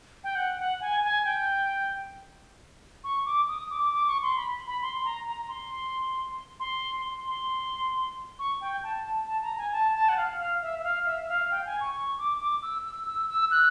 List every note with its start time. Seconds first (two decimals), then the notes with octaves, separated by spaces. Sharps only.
0.24 G5
0.35 F#5
0.59 F#5
0.81 G#5
1.03 G#5
1.25 G5
3.04 C#6
3.26 D6
3.48 D#6
3.70 D6
3.93 D6
4.07 C#6
4.22 C6
4.37 B5
4.67 B5
4.82 C6
5.05 A#5
5.26 A#5
5.48 C6
6.60 C6
7.05 C6
7.27 C6
8.39 C#6
8.61 G5
8.84 A5
9.27 A5
9.42 A#5
9.58 G#5
9.72 A5
9.94 A5
10.09 F#5
10.17 F5
10.39 F5
10.62 E5
10.79 E5
10.84 F5
11.06 E5
11.21 E5
11.29 F5
11.51 G5
11.66 G#5
11.81 C#6
11.95 C#6
12.18 D6
12.40 D6
12.63 E6
12.85 E6
13.06 E6
13.30 E6
13.51 F#6